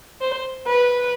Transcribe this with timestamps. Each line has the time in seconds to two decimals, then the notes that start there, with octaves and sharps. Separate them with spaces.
0.21 C5
0.66 B4